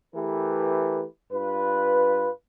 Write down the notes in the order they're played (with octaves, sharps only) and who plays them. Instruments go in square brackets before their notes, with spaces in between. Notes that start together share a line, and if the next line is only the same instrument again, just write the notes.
[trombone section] E3 A3 G4 A#4 B4
G2 F4 B4